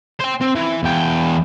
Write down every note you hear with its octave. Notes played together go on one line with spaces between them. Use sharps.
C5 G5
C4
E3
E2 G5